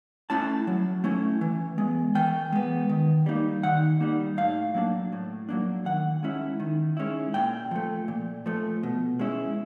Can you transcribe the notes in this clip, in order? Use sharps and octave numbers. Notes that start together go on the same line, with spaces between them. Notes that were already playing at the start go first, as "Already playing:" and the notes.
A3 C#4 E4 A5
F#3
A3 C#4 E4
E3
G#3 B3
E3 G5
G#3 B3
D#3
G3 A#3 D#4
D#3 F#5
G3 A#3 D#4
A2 F5
F#3 A#3 D4
A2
F#3 A#3 D4
D#3 F#5
G#3 C#4 E4
D#3
G#3 C#4 E4
A#2 G5
F3 A3
A#2
F3 A3
B2
G#3 C#4 E4